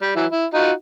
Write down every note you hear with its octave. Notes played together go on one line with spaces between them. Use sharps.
G3
E3 F#3 E4
E4
D#4 F4 F#4